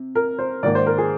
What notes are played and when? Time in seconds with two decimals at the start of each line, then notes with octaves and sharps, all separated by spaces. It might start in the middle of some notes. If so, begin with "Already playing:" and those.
Already playing: C3
0.15 A#4
0.39 C5
0.63 G#2 D#3 A#3 D5
0.75 C5
0.87 A#4
0.98 G#4